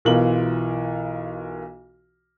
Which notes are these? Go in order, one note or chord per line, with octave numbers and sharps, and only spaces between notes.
B1 E3 F4 A#4 F#7